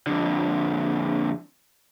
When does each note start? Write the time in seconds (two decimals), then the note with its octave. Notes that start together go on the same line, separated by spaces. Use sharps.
0.07 F2 D3